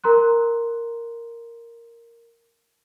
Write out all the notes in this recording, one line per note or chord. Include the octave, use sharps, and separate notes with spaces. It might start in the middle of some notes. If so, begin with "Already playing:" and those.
A#4 A#5 C6 F#6